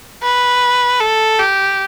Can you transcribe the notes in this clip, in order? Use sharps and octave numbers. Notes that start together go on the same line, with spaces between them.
B4
A4
G4